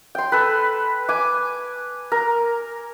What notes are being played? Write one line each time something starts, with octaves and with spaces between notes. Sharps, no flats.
G5 C6
A4 B4
G#5 D6
A#4